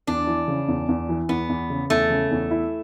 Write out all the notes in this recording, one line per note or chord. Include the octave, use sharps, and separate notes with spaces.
E2 D4
E3
C#3
E2
E2
E3
E2 B3
E2
C#3
E2 A3
C#3
E2
E4